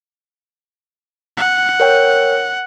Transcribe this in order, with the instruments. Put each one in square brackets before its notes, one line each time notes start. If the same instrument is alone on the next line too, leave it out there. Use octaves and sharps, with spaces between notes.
[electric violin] F#5
[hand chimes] A#4 C#5 G5